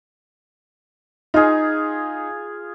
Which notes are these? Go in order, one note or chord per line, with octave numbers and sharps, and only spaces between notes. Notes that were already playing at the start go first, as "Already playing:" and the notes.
D#4 F4 G#4